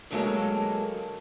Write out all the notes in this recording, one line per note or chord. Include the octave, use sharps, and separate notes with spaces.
D2 G2 F#3 G#3 A#3 A4